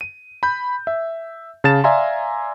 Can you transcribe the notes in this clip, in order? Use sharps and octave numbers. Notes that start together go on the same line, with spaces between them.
D#7
B5 G6
E5
C#3 F5 A5 A6 E7
D5 E5 F5 G#5 A#5 C6